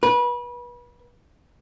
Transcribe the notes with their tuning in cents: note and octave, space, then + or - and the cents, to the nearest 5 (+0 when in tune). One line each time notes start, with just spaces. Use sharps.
B4 -30